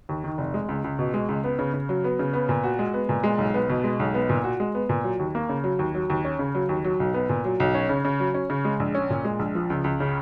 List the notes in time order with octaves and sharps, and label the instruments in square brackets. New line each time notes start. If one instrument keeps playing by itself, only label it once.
[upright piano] D#2
D#3
F1
G#3
C#2
C#2
B2
G#3
C#2
B3
C#3
C#3
F#3
B3
C#3
B3
A#2
F#4
G#3
B3
A#2
G#3
B1
B3
B2
G#3
B1
B3
A#2
F#4
G#3
B3
A#2
F#3
D#2
A#3
C#3
F#3
D#2
F#3
D#2
C#4
C#3
F#3
D#2
F#3
B1
B3
A#2
F#3
B1
C#4
C#3
C#3
F#3
C#4
C#3
G#3
A#1
C#4
A#2
G#3
A#1
F3
C#2
C#2
C#3